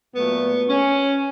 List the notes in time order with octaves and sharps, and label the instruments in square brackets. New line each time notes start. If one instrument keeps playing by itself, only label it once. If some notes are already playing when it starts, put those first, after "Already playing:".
[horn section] A#2 F#3 A3 B3
C#4